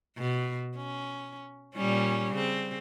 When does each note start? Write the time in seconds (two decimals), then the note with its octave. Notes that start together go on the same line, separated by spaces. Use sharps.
0.17 B2
0.76 C#4
1.75 A#2 G3 C#4
2.33 C#3 C4